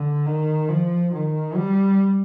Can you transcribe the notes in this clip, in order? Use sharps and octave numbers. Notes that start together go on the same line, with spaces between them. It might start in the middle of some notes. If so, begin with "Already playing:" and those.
Already playing: D3
D#3
F3
D#3
G3